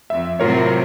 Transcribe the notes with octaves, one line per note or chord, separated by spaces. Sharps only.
F2 E5
A2 C3 F#3 F4 A#4 C#5